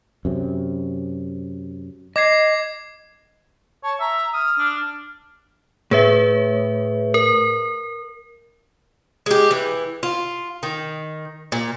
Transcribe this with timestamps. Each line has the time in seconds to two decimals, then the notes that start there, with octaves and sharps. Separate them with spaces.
0.25 F#2 C3
2.16 D#5 D6 G#6 C7
3.83 C#5 A5
4.00 E5 A#5
4.33 D#6 F6
4.59 D4
5.91 A2 G#4 B4 E5
7.14 A#4
9.26 G#3 G4
9.51 E3
10.03 F4
10.63 D#3
11.52 A#2